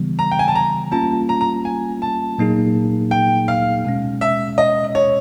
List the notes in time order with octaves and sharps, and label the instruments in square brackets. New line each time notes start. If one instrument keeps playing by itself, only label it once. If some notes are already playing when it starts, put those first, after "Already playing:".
Already playing: [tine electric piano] C#3 E3 G3 B3
[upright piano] A#5
G5
G#5
A5
A#5
[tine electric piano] G3 A#3 C#4 F4 [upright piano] A5
[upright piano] A#5
A#5
G#5
A5
[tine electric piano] A#2 F#3 A#3 D#4 G#4
[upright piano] G5
F5
[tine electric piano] B2 G#3 C#4
[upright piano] E5
D#5
C#5